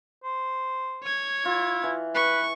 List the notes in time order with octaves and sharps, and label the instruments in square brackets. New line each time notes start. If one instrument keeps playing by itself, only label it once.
[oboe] C5
[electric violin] C#5 G#6
[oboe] E4 [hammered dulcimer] F4
[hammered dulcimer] E3
[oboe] B4 [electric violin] C#6